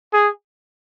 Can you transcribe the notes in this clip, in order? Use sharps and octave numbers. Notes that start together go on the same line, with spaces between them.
G#4